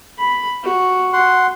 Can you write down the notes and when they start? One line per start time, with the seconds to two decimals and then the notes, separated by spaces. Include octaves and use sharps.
0.19 B5
0.63 F#4
1.13 F#5 C6